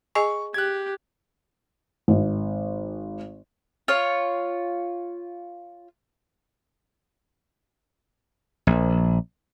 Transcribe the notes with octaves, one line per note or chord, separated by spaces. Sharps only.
G#4 D#5 G#5 C#6
G4 F#6 G#6
G#1
F4 C#5
A#1